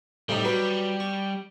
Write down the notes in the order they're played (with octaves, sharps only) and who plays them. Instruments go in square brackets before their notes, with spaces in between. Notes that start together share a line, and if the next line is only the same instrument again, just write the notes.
[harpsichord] A2 C3 D#4 [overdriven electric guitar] G3
[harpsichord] F#3 B4
C#6